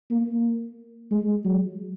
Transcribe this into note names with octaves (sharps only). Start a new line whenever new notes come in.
A#3
G#3
F#3